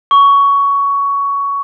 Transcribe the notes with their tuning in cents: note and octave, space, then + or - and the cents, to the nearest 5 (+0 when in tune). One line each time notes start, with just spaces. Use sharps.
C#6 +15